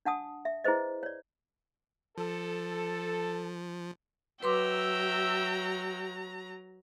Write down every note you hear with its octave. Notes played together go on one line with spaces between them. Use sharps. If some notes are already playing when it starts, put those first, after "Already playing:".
D4 F#5 A5 D#6
E5
E4 G#4 B4 C5 D#5
C#5 D5
F3 A4
F#3 B4 E5 G5 A#5 C6 D6 E6